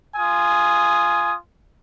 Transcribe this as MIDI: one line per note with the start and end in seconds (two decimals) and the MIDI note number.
0.17 1.36 65
0.17 1.36 80
0.17 1.36 87